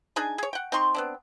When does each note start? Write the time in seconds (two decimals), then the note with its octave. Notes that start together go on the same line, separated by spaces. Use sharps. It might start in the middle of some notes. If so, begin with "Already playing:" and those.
0.16 D4 D#4 G#4 G#5
0.38 G#4 C#5
0.53 F#5 G5
0.72 C4 D#4 C6 C#6
0.94 B3 C4 D4